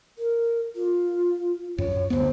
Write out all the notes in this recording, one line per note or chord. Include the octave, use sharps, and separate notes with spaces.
A#4
F4
F#2 C#5
D2 B3 C5